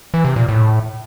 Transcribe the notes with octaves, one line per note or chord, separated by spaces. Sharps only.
E3
C3
A#2
A2